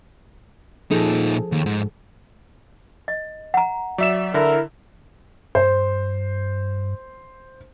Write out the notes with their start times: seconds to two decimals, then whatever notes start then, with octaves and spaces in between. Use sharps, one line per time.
0.91 A#2 F3 D#4 G#4 A4
1.52 D#2
1.66 G#2
3.08 D#5
3.54 F#5 A#5
3.98 F#3 D5 E5 E7
4.34 D3 E4 A#4
5.55 G2 C5